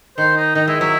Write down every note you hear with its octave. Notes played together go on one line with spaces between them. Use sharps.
D#3 C5
D#4
D#3 D#4
G#3 E4
F#3 E4